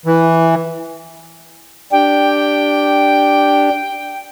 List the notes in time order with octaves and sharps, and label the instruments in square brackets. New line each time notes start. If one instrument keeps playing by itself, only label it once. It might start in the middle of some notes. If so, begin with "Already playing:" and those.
[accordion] E3
[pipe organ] D4 G4 [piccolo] G5